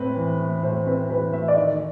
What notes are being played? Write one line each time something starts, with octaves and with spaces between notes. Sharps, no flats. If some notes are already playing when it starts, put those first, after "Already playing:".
Already playing: A2 C4 B4
E3
A3
A2 C5
C4 B4
E3 B4
A3 E5
D5
D#3 D#5